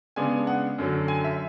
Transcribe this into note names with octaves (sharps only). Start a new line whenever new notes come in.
C#3 G#3 B3 D4 G#5
F#5
F#2 D3 F#3
G#5
E5